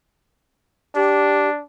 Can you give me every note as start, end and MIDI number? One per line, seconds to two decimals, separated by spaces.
0.96 1.62 62
0.96 1.49 67